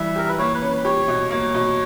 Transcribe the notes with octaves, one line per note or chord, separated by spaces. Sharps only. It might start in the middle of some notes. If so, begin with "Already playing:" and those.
Already playing: E3 G3 E5
G4 A#4
B4
A#3 C#5
B4
C#4
B4
G4 C#5
B2
A#3 C#5
B2